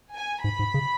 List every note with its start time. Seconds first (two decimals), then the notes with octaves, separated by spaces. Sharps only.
0.14 G#5
0.44 G#2 B5
0.59 G#2
0.74 C#3